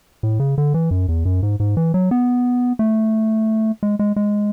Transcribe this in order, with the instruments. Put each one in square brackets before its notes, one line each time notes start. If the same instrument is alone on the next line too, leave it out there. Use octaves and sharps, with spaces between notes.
[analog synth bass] A2
C#3
D3
E3
F#2
E2
F#2
G#2
G#2
E3
F#3
B3
A3
G#3
G#3
G#3